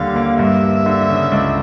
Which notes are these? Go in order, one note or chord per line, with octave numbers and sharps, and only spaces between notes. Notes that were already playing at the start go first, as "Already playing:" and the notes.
Already playing: D#2 D3 G3 F5
A#3
G2 E5
G2
D3
C#3
C#2